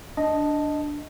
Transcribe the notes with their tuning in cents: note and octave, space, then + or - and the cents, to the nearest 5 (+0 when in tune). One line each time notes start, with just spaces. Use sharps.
D4 +0 D#5 +0 A5 +0